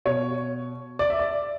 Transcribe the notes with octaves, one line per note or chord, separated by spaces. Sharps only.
B2 C#5
D5
E5
D5